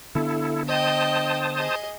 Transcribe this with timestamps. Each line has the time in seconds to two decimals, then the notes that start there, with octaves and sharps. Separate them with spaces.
0.15 D3 B3 D4 E4 A4
0.68 C5 D#5 G5 A5 D#6
1.57 G#4 D#5